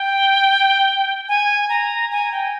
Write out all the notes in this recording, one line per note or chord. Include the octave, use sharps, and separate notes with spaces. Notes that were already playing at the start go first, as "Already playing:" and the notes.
Already playing: G5
G#5
A#5
G#5
G5